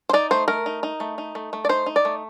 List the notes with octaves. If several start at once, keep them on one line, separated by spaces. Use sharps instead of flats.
C5
D#4 D5
A3 C5
A3 A#4
D#4
D#4
A3
D#4
A3
A3
D5
D#4 C5
D#4
D5
A3